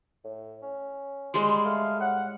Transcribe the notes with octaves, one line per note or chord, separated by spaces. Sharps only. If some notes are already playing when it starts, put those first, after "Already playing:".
A2
C#4
G3 G#3 C6
A3 F5
A2 F#5